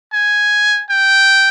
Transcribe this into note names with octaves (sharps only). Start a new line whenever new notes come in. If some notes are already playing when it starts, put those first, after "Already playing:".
G#5
G5